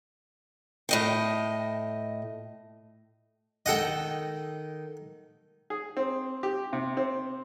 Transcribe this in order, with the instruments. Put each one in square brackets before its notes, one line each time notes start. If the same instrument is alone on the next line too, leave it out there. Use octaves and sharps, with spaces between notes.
[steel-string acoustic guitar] A2 D#5 G5
[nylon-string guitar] D#3 A4 [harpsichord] D#5 F#5 G5
[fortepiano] G#4
C4
G4
C3
C4